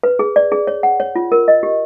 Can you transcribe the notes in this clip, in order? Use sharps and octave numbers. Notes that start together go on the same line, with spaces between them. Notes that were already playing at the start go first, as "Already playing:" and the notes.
B4
G#4
D5
G#4
C#5
F#5
C#5
F4
A#4
D#5
G4